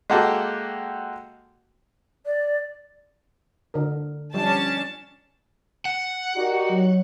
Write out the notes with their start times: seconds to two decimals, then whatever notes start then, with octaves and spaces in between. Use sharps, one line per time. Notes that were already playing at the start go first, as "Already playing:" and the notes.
0.10 G#3 A#3 F#4 G4 A4
2.26 D5
3.74 D3 A#4
4.34 F3 G3 C#4 D4 A5
5.85 F#5
6.36 D#4 F#4 G4 A#4 D5
6.69 F#3 C#5